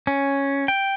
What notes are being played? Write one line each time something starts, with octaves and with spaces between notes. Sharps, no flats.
C#4
G5